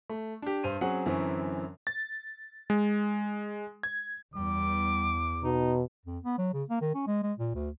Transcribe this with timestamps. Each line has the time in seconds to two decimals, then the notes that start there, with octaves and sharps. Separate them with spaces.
0.10 A3
0.42 D4 G4
0.63 G2 C5 D#7 F7
0.81 F#3 C4 C#4 G#4 F#5
1.06 F#2 D3 E3 F#3 C4 C#4
1.87 A6
2.70 G#3
3.83 G#6
4.36 E2 G3 D6
5.44 B2 D#4
6.05 F2
6.24 B3
6.38 F#3
6.54 C#3
6.70 A#3
6.81 D#3
6.95 C#4
7.07 G#3
7.23 G#3
7.39 A#2
7.55 D2